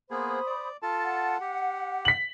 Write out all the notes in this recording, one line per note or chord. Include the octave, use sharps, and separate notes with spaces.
A#3 B3 G#4 C5 B5 D#6
D5
F4 A4 A5
F#5
G4
B6 F#7